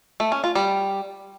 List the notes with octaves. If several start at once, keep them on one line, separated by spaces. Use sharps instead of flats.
A3
C#4
F4
G3